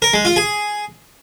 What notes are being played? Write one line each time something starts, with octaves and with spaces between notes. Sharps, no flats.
A#4
G#3
F4
G#4